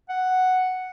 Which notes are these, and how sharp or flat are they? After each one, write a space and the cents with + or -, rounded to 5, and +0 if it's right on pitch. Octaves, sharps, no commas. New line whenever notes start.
F#5 +0